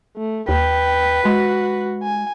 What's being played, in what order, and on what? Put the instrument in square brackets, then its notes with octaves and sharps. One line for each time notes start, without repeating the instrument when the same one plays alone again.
[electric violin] A3
[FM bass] D#2 [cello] B4 [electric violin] G5
[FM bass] G#3 [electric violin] F#4
[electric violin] G#5